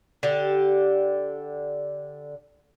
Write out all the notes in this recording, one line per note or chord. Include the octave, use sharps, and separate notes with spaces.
D3 G4